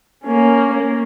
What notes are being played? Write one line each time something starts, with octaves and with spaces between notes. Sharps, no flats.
A#3 C#4